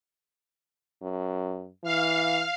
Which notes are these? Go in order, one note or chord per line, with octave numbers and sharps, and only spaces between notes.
F#2
E3 F5